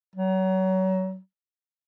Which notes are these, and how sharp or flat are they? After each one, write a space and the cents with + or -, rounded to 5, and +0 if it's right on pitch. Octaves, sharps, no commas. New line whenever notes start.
F#3 +30